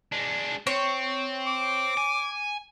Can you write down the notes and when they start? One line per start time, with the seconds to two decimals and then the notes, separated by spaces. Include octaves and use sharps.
0.12 G#3 D4
0.67 C4 C#5
1.47 D6
1.97 G#5